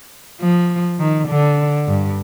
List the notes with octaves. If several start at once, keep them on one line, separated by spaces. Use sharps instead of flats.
F3
D#3
D3
G2